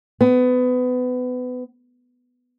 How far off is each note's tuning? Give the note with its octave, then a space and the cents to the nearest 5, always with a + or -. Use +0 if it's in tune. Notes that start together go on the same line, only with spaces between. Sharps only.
B3 +25